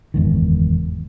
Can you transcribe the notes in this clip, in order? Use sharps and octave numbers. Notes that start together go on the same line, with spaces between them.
F#1 E2 G#2 D#3